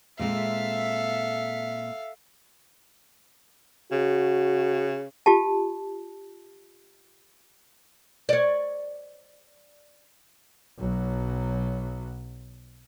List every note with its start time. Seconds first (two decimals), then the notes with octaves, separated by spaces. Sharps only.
0.19 A#2 G#3 C4 A4 E5 F5
3.92 C#3 F#4
5.26 F4 G4 A5
8.29 C#5 D5
10.78 B1 F#3